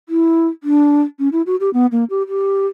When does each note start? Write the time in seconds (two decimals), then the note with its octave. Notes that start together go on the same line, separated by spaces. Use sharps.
0.09 E4
0.64 D4
1.19 C#4
1.32 E4
1.46 F#4
1.60 G4
1.74 B3
1.92 A#3
2.10 G4
2.28 G4